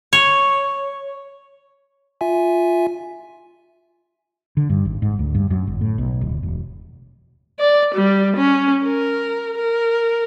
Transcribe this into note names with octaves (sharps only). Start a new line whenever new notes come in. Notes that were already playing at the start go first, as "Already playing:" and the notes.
C#5
F4 E5 G#5
D3
G2
G#1
G#2
D2
G2
F#2
G1
A2
B1
D1
E1
D5
G3
C#4
A#4
A#4